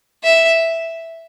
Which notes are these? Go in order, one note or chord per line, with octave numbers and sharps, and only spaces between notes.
E5